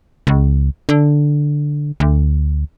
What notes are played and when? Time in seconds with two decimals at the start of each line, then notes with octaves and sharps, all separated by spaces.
0.27 C#2
0.89 D3
2.00 D2